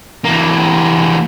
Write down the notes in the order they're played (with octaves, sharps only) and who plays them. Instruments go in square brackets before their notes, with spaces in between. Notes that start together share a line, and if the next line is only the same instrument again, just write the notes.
[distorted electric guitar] E3 A#3